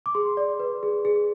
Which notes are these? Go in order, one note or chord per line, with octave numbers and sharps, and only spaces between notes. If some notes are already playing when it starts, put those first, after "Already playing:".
D6
G#4 C6
D5
B4
G#4
G#4